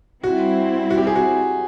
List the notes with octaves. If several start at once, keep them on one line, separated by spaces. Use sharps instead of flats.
G3 C4 E4 F#4
F#4
G4
G#4
F#4